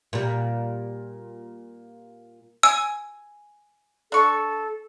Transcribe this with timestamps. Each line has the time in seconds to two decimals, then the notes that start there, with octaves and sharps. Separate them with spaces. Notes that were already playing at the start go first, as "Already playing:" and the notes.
0.13 A#2 G3
2.63 G#5 E6
4.12 D4 A4 C#6